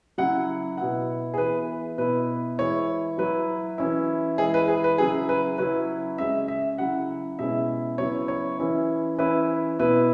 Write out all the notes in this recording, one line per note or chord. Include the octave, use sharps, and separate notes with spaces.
C#3 F#3 E4 F#5
B2 B3 E4 F#5
G#4
E3 B3 E4 B4
B2 B3 E4 B4
E3 G#3 E4 C#5
F#3 E4 B4
E3 C#4 E4
E3 G#3 E4 G#4
B4
G#4
B4
C#3 F#3 E4 G#4
B4
C#3 F#3 C#4 E4 B4
C#3 G#3 C#4 E5
E5
C#3 F#3 E4 F#5
B2 G#3 C#4 E4 E5
C#3 F#3 B3 E4 C#5
C#5
E3 C#4 E4
E3 C#4 E4 B4
B2 B3 E4 B4